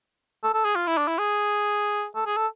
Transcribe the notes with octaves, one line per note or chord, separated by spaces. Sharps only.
A4
A4
G#4
F4
E4
D4
E4
G#4
A4
G#4
A4